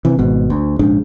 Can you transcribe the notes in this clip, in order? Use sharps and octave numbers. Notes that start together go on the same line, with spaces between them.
C3 E3
G#1 G#2 B2
D2
A#1 G#2 C#3 D4